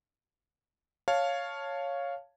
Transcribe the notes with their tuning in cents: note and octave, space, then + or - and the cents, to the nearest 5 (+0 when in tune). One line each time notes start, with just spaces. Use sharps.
C#5 +0 F5 +0 A5 +0